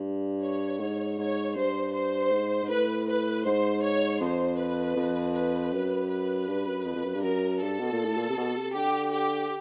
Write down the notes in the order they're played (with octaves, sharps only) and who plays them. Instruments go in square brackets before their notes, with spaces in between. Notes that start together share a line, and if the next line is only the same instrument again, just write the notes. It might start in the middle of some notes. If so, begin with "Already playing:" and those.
Already playing: [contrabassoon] G2
[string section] C#5
[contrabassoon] G#2
[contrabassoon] G#2 [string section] C#5
[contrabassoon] G2 [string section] C5
[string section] C5
[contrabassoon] G#2
G#2
[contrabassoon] A2 [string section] B4
[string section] B4
[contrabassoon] G#2 [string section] C5
[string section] C#5
[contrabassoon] F2 [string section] C5
[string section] B4
[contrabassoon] F2
[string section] B4
[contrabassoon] F#2
[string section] B4
[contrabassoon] G2
F#2
F2
F2
F#2
G2
[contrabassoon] F#2 [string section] A#4
[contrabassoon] G2 [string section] A4
[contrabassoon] B2
A#2
A2
A#2
C3
B2
C3
[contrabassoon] D3 [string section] G4
[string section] G4